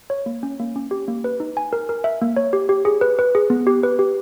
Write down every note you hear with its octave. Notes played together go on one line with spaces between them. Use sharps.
C#5
A#3
C#4
A#3
C#4
G4
A#3
B4
D#4
G#5
A#4
A#4
E5
A#3
C#5
G4
G4
G#4
B4
B4
G#4
B3
G4
B4
G4